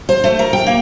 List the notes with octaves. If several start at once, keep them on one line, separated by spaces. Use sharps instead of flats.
C5
A3
A#4
G5
A#3